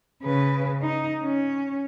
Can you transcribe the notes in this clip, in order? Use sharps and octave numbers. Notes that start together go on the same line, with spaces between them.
C#3 B4
D#4
C#4